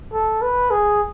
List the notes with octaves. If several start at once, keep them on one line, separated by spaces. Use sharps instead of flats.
A4
B4
G#4